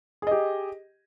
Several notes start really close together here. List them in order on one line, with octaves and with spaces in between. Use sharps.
G#4 D#5 G4